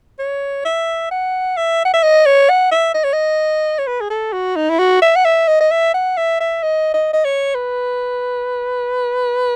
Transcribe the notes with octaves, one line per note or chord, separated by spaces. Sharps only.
C#5
E5
F#5
E5
F#5
E5
D#5
C#5
F#5
E5
D#5
C#5
D#5
C#5
B4
G#4
A4
F#4
D#4
E4
F#4
E5
F#5
E5
D#5
D#5
E5
F#5
E5
E5
D#5
D#5
D#5
C#5
B4